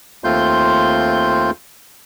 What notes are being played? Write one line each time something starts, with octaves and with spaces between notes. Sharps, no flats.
D#2 A3 C4 F4 C6 G6